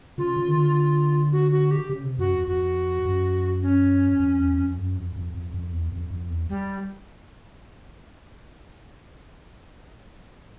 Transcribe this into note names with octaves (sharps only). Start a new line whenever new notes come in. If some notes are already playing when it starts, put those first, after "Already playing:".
C#3 F4
C#3
D#3
D3
F#4
F#4
G4
C#3
C3
F#2 F#4
F2
F2 F#4
F#2
C#4
F2
E2
F2
F#2
F2
F2
F2
F2
E2
F2
F2
E2
G3